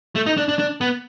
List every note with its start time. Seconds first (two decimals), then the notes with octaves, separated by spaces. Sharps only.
0.15 A3
0.26 D#4
0.37 D4
0.48 D4
0.59 D4
0.81 B3